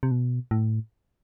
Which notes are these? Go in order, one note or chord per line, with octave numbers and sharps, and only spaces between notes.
C3
B2
A2